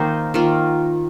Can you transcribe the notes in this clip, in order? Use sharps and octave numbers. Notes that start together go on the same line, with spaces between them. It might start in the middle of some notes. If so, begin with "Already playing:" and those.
Already playing: D#3 A#3 D#4 C5
D#3 A#3 F4